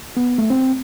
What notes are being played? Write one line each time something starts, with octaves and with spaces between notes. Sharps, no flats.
B3
A3
C4